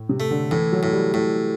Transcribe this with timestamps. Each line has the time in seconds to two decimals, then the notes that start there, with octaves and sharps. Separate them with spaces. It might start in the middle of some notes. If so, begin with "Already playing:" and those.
Already playing: A2
0.09 C3
0.20 A3
0.31 D3
0.51 A2 E3
0.73 F#3
0.83 A2
0.92 G3
1.14 A2 A3